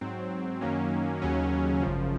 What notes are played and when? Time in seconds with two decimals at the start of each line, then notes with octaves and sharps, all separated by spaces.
0.01 G#2 F#3 C4
0.61 F#2 D#3 F#3 A#3 C#4
1.22 D#2 C#3 F#3 C#4
1.82 G#1 F#2 C#3 F3